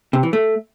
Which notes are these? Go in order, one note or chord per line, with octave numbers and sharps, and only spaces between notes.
C3
E3
A3